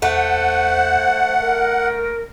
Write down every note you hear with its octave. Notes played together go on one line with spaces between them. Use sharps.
E2 A3 C5 F#5
D#1 A#4